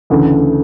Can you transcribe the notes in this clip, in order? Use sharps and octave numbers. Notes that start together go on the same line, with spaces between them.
D2 C#3 E3 A3